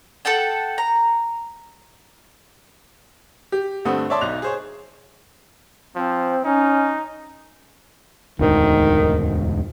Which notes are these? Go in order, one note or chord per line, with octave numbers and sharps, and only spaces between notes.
A4 F#5 G5 A5
A#5
G4
G2 D3 A3 C4 F#5 D#6
C#5 D5 E5 A5 C6 D6
B1 D#4 F#6 F7
G#4 C5 C#5
F3 C4
C#4 D#4
E1 D2 G#2 D#3